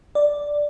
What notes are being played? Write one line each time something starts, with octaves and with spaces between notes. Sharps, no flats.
D5